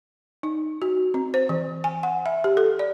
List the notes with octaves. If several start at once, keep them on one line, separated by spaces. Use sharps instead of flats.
D#4
F#4
C4
C5
E3
G#5
F#5
E5
G4
A4
D5